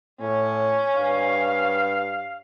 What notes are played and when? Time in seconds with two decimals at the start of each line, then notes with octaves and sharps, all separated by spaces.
0.20 A2 C#4
0.96 G2 F5